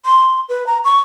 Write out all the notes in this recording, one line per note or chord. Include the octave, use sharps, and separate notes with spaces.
C6
B4
A#5
C#6